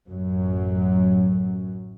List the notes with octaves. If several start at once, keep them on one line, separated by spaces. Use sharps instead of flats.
A1 F#2 F#3